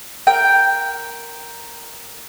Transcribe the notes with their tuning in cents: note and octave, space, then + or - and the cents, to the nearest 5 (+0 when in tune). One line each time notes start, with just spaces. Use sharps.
A#4 +0 G5 +0